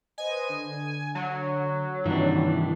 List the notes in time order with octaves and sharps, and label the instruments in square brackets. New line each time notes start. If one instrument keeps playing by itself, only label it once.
[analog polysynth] B4 C5 D#5 [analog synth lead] G#5
[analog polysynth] D3
[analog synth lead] F#3
[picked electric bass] G2 C3 [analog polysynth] D#3 [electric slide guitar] E3 D4